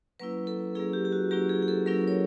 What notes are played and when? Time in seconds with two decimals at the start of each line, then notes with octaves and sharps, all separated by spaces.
0.19 F#3 A#3 C#4 E4 B4
0.47 A4
0.75 F#3 A#3 C#4 E4 G#4
0.93 G4
1.05 G4
1.12 F#4
1.31 F#3 A#3 C#4 E4 G4
1.49 G#4
1.62 G#4
1.68 A4
1.86 F#3 A#3 C#4 E4 A#4
2.08 C#5